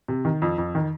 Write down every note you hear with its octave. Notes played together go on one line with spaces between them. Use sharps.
C3
D#3
F2
F2
D#3